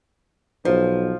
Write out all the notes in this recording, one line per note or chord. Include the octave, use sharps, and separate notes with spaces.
B1 F3